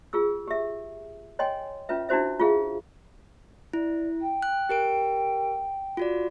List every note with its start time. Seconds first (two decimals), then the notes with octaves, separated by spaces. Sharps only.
0.13 F4 G#4 E6
0.48 G4 E5
1.39 C#5 D#5 G5 G#5 C6
1.89 C#4 F4 B4 E5
2.09 D4 E4 F#4 C5 E5
2.40 F4 G#4 E5 F5
3.73 E4 D5
4.21 G5
4.43 F#6
4.69 G4 A#4 D7
5.97 F4 F#4 D5